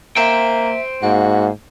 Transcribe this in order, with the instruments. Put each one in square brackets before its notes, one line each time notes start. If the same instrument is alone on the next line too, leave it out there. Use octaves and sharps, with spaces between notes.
[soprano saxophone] A#3 [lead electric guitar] C5 G5 [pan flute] E5
[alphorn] G#2 [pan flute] A#3 [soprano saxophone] F#4